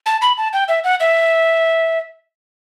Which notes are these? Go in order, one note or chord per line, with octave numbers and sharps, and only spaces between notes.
A5
B5
A5
G5
E5
F#5
E5